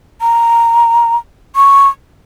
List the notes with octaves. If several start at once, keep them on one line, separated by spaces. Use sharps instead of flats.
A#5
C#6